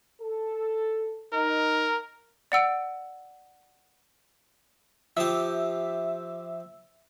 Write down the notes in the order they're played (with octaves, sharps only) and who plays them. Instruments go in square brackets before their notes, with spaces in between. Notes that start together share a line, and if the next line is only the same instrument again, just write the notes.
[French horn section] A4
[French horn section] D#4 [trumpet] A#4
[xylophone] D5 F#5 E6 D7
[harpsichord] F3 G4 [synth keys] E5